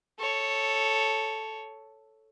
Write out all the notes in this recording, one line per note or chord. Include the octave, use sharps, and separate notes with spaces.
A4 C#5